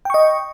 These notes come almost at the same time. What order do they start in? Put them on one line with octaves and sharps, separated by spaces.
G5 C#6 D#5